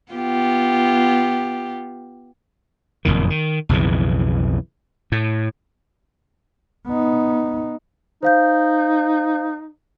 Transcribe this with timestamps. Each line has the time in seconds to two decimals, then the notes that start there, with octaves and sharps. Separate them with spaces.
0.12 B3 F4 G4
3.05 F#1 F2 A#2 D#3
3.30 D#3
3.69 B1 F2 C#3 E3
5.12 A2
6.87 B3 D#4
8.23 D#4 C5 F5 G6